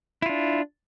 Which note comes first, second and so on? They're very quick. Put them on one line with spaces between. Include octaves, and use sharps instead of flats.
E4 F4 D4